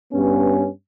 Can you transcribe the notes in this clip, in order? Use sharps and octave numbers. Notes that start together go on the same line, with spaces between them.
G2 B3 C#4